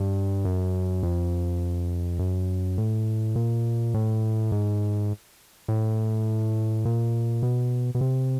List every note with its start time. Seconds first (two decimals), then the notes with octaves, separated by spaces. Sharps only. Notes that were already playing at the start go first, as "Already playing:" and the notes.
Already playing: G2
0.45 F#2
1.03 F2
2.19 F#2
2.78 A2
3.36 A#2
3.94 A2
4.52 G#2
5.68 A2
6.85 A#2
7.43 B2
7.95 B2
8.01 C3